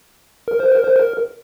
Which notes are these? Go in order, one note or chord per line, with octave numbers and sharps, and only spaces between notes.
A#4
C5
A#4
C5
A#4